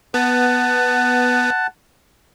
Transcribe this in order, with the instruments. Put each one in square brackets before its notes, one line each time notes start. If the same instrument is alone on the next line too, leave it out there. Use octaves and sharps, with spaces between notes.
[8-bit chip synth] B3 [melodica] F#5 A5